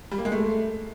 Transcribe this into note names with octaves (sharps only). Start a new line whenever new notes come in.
G3
A#3
G#3
A3